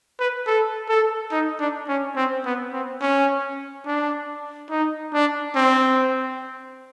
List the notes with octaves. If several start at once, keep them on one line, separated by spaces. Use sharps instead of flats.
B4
A4
A4
D#4
D4
C#4
C4
B3
C4
C#4
D4
D#4
D4
C4